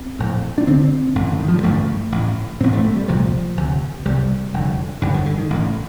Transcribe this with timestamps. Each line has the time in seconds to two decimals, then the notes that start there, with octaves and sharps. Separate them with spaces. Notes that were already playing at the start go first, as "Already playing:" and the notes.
Already playing: C4
0.19 A#1 A2
0.58 D4
0.67 D2 D3 C4
1.15 A1 G2 D3
1.32 D3
1.40 D#3
1.48 F3
1.56 G3
1.63 A1 G2 D3 A3
2.12 A1 A2
2.60 A1 A2 C4
2.73 A3
2.84 A3
2.96 G3
3.08 C2 A#2 F3
3.57 D2 C3
4.05 C2 C3 G3
4.53 F1 F2 D3
5.02 G1 G2 D3 G3
5.14 D#3
5.26 D3
5.38 D#3
5.50 A1 A2